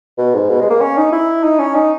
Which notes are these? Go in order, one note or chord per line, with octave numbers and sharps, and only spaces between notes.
B2
G#2
B2
G#3
A#3
C#4
D#4
E4
D#4
C#4
D#4